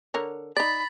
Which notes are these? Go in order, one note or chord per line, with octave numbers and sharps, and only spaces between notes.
D3 A#4 C#5
D#4 D5 B5 A6